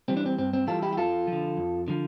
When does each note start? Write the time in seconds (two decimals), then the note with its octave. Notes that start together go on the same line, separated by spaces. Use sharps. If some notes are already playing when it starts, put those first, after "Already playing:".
0.08 E3 G3 C4
0.17 D4
0.26 C4
0.38 G2 C4
0.53 C4
0.67 E3 G3 F4 A4
0.82 E4 G4
0.93 G4
0.97 F2 F4 A4
1.27 D3 F3
1.57 F2
1.88 D3 F3